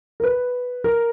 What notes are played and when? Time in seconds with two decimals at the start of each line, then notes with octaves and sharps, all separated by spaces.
0.20 A#4
0.24 B4
0.84 A#4